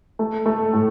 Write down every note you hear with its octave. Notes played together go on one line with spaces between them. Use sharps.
A3
A3
A2